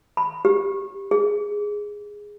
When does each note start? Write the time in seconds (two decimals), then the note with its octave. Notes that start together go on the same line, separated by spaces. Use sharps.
0.17 B5
0.45 G4
1.11 G#4